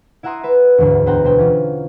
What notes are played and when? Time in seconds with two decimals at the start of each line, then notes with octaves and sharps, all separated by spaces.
0.23 E4 E5 F#5 A#5 C6 D#6
0.43 B4 E5
0.78 E1 D2 G#2
1.06 B3 C5 F#5 G5 A#5
1.24 B2 C5 G5
1.38 E3 C#4 F4